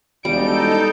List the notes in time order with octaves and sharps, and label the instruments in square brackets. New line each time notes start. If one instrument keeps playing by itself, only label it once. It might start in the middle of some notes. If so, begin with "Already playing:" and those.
[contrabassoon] E1 [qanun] G3 [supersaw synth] D#4 A4 G6 [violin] D7